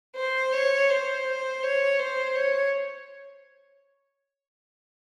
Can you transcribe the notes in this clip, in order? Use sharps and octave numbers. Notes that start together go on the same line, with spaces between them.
C5
C#5
C5
C#5
C5
C#5